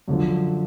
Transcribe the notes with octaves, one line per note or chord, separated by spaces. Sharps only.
F#2 D3 F3